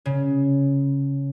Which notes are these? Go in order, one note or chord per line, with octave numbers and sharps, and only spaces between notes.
C#3